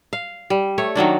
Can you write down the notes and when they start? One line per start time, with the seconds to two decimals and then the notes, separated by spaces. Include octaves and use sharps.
0.13 F5
0.50 G3
0.78 A3 C#5
0.95 D#3 F#3 A#3 D4